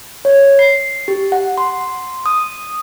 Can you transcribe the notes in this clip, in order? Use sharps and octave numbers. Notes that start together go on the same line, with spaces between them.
C#5
C7
G4
F#5
C6
D#6